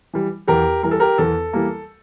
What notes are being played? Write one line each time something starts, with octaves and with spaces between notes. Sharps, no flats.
E3 G3
E2 G4 A#4
E3 G3 A#4
A4
G4 A#4
E2 A4
E3 G3 A#3